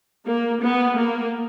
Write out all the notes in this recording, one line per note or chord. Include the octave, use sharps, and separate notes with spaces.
A#3
B3
A#3